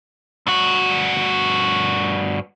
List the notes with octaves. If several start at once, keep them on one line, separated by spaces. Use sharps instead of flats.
G2 F#4